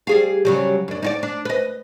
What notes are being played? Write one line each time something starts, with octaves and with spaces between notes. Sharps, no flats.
G3 G#4 F5
C#3 F#3 G3
F#2 D4
D#4 F4 D5
D4
B4 D#5